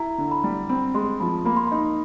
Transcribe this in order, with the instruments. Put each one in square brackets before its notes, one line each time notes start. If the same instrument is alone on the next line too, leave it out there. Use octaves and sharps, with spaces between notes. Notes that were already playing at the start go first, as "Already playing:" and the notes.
Already playing: [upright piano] E4 [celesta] A#5
[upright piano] D3
[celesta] B5
[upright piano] G3
[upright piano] C4 [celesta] B5
[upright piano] G#3 [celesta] C6
[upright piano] F3 [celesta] B5
[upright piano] A#3 [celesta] B5
[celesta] C6
[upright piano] D#4 [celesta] B5